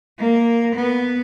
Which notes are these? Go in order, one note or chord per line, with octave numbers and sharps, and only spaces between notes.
A#3
B3